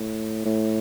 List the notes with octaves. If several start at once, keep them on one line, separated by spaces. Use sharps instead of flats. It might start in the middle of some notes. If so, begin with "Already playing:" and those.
Already playing: A2
A2